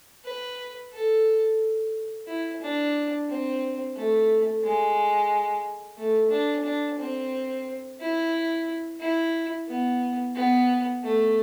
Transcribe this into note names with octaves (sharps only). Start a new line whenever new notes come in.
B4
A4
E4
D4
C4
A3
G#3
A3
D4
D4
C4
E4
E4
B3
B3
A3